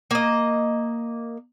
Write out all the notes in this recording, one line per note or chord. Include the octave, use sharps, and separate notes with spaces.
A#3 D#5